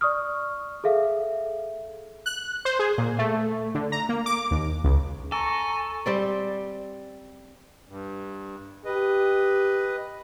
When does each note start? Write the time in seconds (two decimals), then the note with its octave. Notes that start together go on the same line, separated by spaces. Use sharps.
0.01 D5 C#6 D#6 F6
0.84 G#4 A4 E5 F5
2.26 F#6
2.65 C5
2.79 G#4
2.98 A#2
3.19 A3
3.75 D3
3.92 A#5
4.09 A#3
4.26 D6
4.51 D#2
4.84 C#2
5.32 A4 G#5 A#5 C#6
6.06 G3 C4 D5
7.88 G2
8.85 G4 B4 D#5